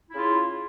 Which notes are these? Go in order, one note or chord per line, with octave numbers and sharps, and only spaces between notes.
C#3 E4 F4